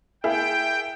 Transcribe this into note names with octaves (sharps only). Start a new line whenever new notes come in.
A#3 E4 G#4 G5